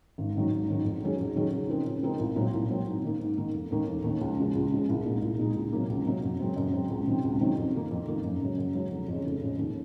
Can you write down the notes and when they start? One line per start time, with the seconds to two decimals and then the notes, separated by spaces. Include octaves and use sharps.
0.18 G#1
0.35 G#2 D#3 F#3
0.52 G#1
0.69 G#2 D#3 F#3
0.85 F2
1.02 D#3 F#3 C#4 G#4
1.19 F2
1.36 D#3 F#3 C#4 G#4
1.53 C#3
1.69 F3 C4 D#4 A#4
1.86 C#3
2.03 F3 C4 D#4 A#4
2.20 C2
2.36 A#2 F#3 C4
2.54 C2
2.70 A#2 F#3 C4
2.87 G#2
3.04 D#3 A#3
3.20 G#2
3.37 D#3 A#3
3.54 F1
3.71 D#2 D#3 A#3
3.88 F1
4.04 D#2 D#3 A#3
4.21 C#2
4.38 C#3 F3 G#3
4.55 C#2
4.72 C#3 F3 G#3
4.89 C2
5.06 A#2 G#3 D#4
5.22 C2
5.39 A#2 G#3 D#4
5.56 C#2
5.73 C3 F#3 A#3
5.89 C#2
6.06 C3 F#3 A#3
6.23 F#2
6.40 C#3 F#3 C4
6.56 F#2
6.73 C#3 F#3 C4
6.90 C#2
7.07 C3 D#3 F#3 C4
7.24 C#2
7.41 C3 D#3 F#3 C4
7.57 F2
7.75 D#3 A#3
7.91 F2
8.08 D#3 A#3
8.24 F#2
8.41 C#3 F#3
8.58 F#2
8.75 C#3 F#3
8.91 F1
9.08 F2 C#3
9.25 F1
9.42 F2 C#3
9.59 D#2